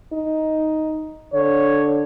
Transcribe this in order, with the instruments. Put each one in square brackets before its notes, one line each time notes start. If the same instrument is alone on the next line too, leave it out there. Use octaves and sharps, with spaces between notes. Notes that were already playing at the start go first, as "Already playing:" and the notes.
[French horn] D#4
[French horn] D3 [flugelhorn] C#5